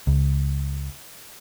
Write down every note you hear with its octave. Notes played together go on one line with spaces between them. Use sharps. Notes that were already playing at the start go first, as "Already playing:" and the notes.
C#2